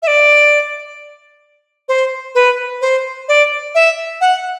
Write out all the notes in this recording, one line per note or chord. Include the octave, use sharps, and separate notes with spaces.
E5
D5
C5
B4
C5
D5
E5
F#5